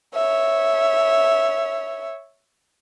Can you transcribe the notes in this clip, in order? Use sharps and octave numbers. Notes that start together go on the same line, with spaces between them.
C#5 E5